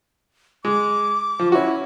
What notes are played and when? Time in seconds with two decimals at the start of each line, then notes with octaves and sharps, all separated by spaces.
0.65 G#3 D6
1.39 F3
1.52 C#4 E4 F#4